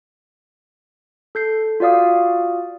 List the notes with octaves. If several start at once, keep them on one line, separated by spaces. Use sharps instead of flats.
A4 G6 C7
F4 F#4 D5 F5 D#6